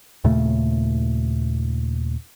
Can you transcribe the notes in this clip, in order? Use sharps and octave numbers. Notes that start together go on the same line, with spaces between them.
D#2 A#2 C#3 A3